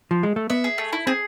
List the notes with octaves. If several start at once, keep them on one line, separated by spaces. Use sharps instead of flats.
F3
G#3
A3
B3 E5
G#4
A3
E4
C4 G#4